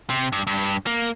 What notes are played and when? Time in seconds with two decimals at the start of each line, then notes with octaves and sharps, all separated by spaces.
0.10 C3
0.32 G2
0.47 G2
0.87 A#3